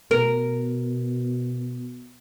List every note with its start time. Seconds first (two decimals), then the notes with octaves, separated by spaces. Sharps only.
0.11 B2 A#4